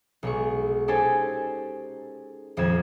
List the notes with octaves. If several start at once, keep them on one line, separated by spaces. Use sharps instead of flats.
B1 G#3 C#6
C#4 D#4 G4 A4 C5 G#5
D#1 F2 F3 G3 G#6 E7